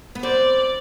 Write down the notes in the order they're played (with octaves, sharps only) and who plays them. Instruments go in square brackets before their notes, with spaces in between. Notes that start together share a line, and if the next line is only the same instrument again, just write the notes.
[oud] B3
[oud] C4 [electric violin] D5